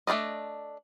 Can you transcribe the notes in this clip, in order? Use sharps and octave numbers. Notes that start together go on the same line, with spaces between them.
A3 D4 B4 D5 D#5